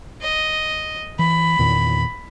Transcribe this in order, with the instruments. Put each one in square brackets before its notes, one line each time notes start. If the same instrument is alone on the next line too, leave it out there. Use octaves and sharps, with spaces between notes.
[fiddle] D#5
[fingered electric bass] E3 [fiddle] B5
[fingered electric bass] E2 A#2 D#3